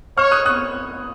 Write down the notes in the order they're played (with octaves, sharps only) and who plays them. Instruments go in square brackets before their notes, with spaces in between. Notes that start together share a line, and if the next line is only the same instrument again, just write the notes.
[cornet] C#5 [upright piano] C#6 F6
[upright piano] D#6 F#6
D#6 F#6